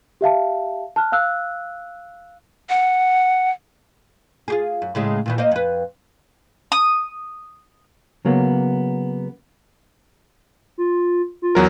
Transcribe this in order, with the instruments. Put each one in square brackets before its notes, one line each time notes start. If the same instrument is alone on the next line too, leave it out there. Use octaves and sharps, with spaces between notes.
[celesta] G4 E5 F5 A5
A5 F6 F#6
F5 E6 F#6
[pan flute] F#5
[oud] F4 G4 G#4
F#2
A2 C#3 G#3
A#2 D#3 E3
A#3 C5 D#5
F2 B4
[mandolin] D#6
[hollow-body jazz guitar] C#3 F#3 A#3 B3
[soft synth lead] F4
F4
[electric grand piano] E2 F#3 A#4